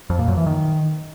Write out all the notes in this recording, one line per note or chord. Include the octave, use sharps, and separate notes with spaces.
F2
A#2
F#2
E3
D#3